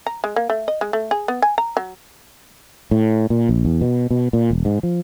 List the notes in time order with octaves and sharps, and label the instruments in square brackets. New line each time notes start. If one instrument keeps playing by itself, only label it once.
[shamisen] A#5
G#3
A#3
A3
D#5
G#3
A3
G#4
B3
G#5
A#5
F#3
[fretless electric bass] A2
A#2
A#1
E2
B2
B2
A#2
E1
G#2
F3